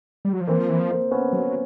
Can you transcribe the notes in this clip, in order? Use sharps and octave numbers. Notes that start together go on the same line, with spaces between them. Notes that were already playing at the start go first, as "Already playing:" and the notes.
G3
F#3
F3
E3 A#3 C4
F3
E3
F3
A#3 C4
B3 C#4
F#3